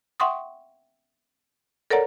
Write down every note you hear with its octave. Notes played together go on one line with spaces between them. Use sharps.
E5 F#5 G5 C6 C#6 D#6
A4 A#4 C#5 D5 F#5 A#5